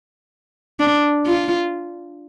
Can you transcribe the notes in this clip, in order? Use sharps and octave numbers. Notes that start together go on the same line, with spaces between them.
D4
F4